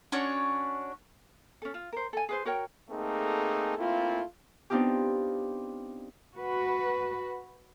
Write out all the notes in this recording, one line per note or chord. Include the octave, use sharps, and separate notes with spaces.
C#4 D4 F#4 C#5
C#4 A4
F4
A#4 C5
A4 G#5
G#4 B4 C5
F#4 A#4 C#5 G5
A3 A#3 C4 D#4 G#4 A4
A3 A#3 C4 E4 F4
B3 C4 D4 D#4 F4 G4
F#4 B4